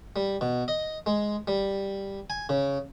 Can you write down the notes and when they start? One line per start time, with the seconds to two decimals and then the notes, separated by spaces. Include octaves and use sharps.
0.16 G3
0.41 B2
0.68 D#5
1.06 G#3
1.48 G3
2.30 G#5
2.49 C#3